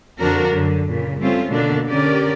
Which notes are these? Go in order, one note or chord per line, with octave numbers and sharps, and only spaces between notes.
F2 D3 F3 D4 F#4 A#4
F#2 D3 F#3
A#2 C#3
G3 A3 C4 C#4 F4
B2 D3 A#3 D4
D3 C#4 G4 A#4 D5